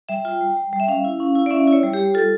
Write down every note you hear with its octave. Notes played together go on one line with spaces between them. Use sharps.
G3 E5
F4 G5
G3
G3
G3
E5
C#4 F5
E4
C#4
E4
D5
C#4 E5
E4
C#5
G3
G4
G3
F4 A4